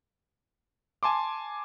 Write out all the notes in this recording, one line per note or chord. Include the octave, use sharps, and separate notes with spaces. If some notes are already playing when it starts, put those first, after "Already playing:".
G#5 A5 C6 D6